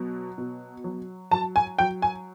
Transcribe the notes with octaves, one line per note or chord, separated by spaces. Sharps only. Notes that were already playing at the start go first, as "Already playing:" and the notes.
Already playing: B2 F#3
B2
F#3
F#3 A5
G#5
F#3 G5
G#5